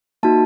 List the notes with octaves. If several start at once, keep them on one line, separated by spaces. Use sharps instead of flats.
A#3 D#4 F#4 A5